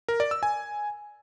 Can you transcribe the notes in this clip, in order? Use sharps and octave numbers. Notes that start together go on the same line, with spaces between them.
A#4
D5
E6
G#5